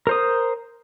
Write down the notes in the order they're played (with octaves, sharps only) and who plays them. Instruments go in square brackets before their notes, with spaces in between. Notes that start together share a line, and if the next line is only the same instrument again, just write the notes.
[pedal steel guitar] A#4 C5 D#6